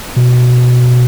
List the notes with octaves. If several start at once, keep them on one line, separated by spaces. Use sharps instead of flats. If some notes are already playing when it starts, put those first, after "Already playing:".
B2